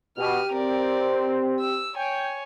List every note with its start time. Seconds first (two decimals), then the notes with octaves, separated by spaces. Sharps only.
0.18 B2 G4 F6 D#7
0.53 C4 A#4 D5
1.60 E6
1.96 C#5 G5 G#5